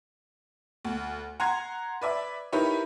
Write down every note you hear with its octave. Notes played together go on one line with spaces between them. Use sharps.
D2
F#5 A#5 C6 G#6
B4 D5 E5
D#4 E4 G4 A#4 B4 C#5